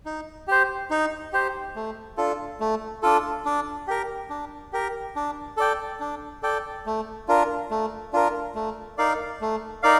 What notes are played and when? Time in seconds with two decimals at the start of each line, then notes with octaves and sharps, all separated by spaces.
0.06 D#4
0.48 G4 C5
0.91 D#4
1.33 G4 C5
1.76 A3
2.17 D4 F4 A4
2.60 A3
3.03 D4 F4 A4
3.45 D4
3.87 G4 A#4
4.30 D4
4.73 G4 A#4
5.16 D4
5.57 A4 D5 G5
6.00 D4
6.43 A4 D5 G5
6.86 A3
7.28 D4 F4 A#4
7.71 A3
8.13 D4 F4 A#4
8.55 A3
8.98 D#4 A#4 D5 F5
9.41 A3
9.83 D#4 A#4 D5 F5